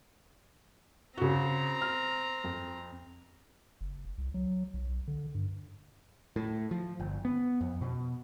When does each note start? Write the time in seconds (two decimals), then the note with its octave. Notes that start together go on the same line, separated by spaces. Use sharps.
1.18 C#3 C4 F#4 A#5
1.82 F6
2.44 F2
3.81 F#1
4.18 C2
4.34 F#3
4.74 B1
5.08 D3
5.35 G2
6.36 A2
6.71 F3
7.00 G1
7.25 B3
7.61 F2
7.81 B2